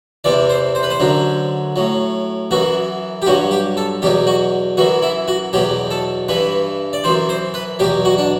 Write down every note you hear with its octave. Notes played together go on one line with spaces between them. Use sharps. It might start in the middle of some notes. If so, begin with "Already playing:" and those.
E2 C3 E3 D5
C5
C5
B4
C5
F#2 D3 F#3
A2 F#3
F#2 E3 F#4
G4
G2 F#3 F#4
G4
A4
E2 B2 F#3 G4
F#4
F#2 E3 F#4
E4
F#4
E2 B2 F#3 G4
A4
G2 E3 B4
D5
F#2 E3 C5
C5
B4
E2 B2 F#3 G4
F#4
D4